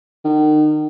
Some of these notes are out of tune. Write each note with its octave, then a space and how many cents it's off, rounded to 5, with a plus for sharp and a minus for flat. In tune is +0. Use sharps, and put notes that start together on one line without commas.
D#3 -35